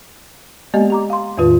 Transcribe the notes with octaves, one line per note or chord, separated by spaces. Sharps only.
G#3 A#3 B3 G4 D5 D#5
G4 A#5 D6
F5 C6
E2 A2 D#3 F4 B4